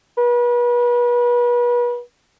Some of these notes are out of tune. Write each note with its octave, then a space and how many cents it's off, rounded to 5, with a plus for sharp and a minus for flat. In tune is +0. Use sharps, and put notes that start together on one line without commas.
B4 -35